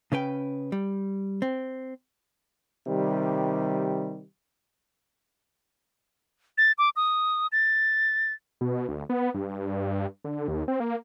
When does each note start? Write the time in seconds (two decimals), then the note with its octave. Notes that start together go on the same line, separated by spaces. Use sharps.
0.12 C#3 C#4 B4 G5
0.72 G3
1.42 C4
2.88 C3 D#3 G3
6.58 A6
6.78 D6
6.96 D#6
7.52 A6
8.61 B2
8.88 D2
9.09 B3
9.34 G2
10.25 D3
10.48 D#2
10.68 C4
10.80 A#3